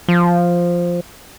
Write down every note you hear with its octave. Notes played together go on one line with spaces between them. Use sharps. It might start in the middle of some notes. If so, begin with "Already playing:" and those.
F3